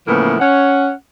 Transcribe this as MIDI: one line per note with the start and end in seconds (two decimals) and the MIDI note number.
0.07 0.37 45
0.07 0.37 49
0.07 0.37 52
0.07 0.37 53
0.07 0.37 58
0.07 0.37 59
0.40 0.91 61
0.40 0.91 78